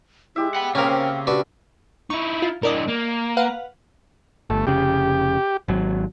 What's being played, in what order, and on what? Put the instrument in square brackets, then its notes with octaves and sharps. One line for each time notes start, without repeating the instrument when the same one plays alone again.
[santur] G#3 G4 E5 [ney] E4
[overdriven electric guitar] F#5 B5 [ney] G5
[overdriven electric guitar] C#3 [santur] A#3 C4 [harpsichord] C#4 A#4 [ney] G5
[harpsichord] D4 F#4 B4 [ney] G4
[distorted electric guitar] D#4 E4 [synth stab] C#6
[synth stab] F4
[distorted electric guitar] E3 D4 [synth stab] A#4 D5 D#5
[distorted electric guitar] A#3
[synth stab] B4 F5 F#5
[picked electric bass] G1 [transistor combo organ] A3
[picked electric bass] F1 C#3 [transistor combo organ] G4
[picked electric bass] G#1 F#3